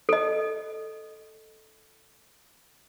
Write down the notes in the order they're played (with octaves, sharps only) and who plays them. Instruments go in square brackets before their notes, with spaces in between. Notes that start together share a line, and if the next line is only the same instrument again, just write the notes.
[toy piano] A4 D#5